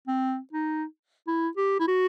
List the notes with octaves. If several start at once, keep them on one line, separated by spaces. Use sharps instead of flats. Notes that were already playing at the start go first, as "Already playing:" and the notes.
C4
D#4
E4
G4
E4
F#4